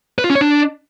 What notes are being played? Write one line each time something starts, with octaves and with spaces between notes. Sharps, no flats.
B4
F4
C#4
C#5
D4